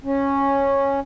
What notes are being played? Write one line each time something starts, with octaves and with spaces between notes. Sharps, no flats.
C#4